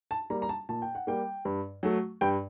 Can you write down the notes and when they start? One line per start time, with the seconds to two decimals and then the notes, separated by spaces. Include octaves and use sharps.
0.11 A5
0.30 G3 A#3 A#5
0.42 A#5
0.49 A5
0.69 A#2 A5
0.82 G5
0.95 F#5
1.07 G3 A#3 G5
1.45 G2
1.83 F#3 A3
2.21 G2 G5